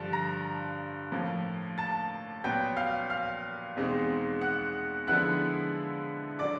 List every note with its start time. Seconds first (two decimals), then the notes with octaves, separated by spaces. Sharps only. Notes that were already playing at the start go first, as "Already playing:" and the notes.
Already playing: G2 D3 F3 A5 A6
0.13 A#5 A#6
1.12 A2 F3 A#3
1.78 A5 A6
2.44 A#2 F#3 B3 G5 G6
2.77 F5 F6
3.10 F5 F6
3.76 E2 B2 G#3 C4 D#4
4.41 F#5 F#6
5.07 D3 F3 G#3 B3 E4 F#5 F#6
6.39 D3 F#3 D5 D6